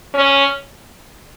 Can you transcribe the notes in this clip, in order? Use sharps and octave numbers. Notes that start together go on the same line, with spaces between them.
C#4